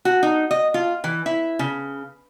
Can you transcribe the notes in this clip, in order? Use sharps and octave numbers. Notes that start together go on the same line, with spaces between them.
F#4
D#4
D#5
F4
E3
E4
C#3